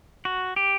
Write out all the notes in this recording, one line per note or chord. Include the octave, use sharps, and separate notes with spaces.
F#4
G4